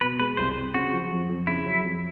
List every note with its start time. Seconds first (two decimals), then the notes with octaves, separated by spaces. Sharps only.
0.01 B2 B4
0.20 G#3 B4
0.37 C2 C5
0.56 C4
0.74 C#3 F#4
0.93 F3
1.11 F2
1.29 F2
1.47 C#3 E4
1.66 F#3
1.85 F2